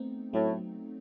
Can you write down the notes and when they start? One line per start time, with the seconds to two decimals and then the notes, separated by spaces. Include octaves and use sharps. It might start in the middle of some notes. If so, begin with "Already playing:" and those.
Already playing: A3 B3 C4 D#4
0.33 A2 F#3 A3